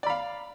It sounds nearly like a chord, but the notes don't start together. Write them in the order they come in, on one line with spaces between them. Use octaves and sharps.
D5 B5 F5